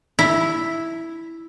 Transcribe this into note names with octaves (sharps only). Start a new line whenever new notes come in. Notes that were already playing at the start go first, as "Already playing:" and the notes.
E4